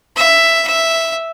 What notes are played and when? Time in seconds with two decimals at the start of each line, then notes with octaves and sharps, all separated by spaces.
0.16 E5
0.67 E5